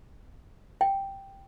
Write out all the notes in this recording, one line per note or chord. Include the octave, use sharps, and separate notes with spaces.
G5